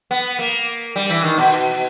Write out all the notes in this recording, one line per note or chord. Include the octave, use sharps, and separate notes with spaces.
B3
A#3
G3
E3
D#3
B2